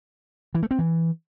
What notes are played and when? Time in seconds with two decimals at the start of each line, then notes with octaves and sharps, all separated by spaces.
0.55 E3
0.63 A3
0.71 C4
0.79 E3